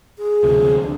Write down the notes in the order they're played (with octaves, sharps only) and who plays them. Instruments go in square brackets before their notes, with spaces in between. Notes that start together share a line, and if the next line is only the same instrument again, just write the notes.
[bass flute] G#4
[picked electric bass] D2 C3 F3
[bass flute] D3